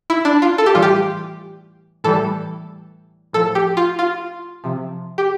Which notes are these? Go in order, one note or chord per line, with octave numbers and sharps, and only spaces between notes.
E4
D4
F4
A4
G4
A2 E3 G3 F4
G4
A2 E3 G3 A4
A2 F3 A4
G4
F4
F4
C3 F3
G4